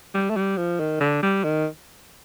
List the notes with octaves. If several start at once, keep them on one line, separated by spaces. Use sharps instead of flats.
G3
A3
G3
F3
D#3
D3
G3
D#3